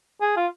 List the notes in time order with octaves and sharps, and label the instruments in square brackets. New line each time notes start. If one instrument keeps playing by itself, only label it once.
[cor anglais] G#4
F4